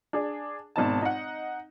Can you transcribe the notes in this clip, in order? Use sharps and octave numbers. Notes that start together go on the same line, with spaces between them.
D4 G#4
G#1 B2 D#4 A5
D#4 F#5